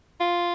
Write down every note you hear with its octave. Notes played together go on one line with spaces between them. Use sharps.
F4